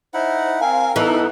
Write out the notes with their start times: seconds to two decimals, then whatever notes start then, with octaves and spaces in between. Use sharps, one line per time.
0.14 D#4 E4 C5 F#5
0.61 C4 A#4 F5 G#5
0.96 E3 B3 D#4 A4 D#5